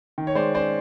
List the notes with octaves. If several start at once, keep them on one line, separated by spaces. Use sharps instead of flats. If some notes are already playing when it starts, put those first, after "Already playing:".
D#3
C#5
G#3 C5 D5
C#4 C5 D5